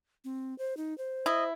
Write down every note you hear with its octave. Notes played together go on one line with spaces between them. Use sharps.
C4
C5
D#4
C5
E4 D#5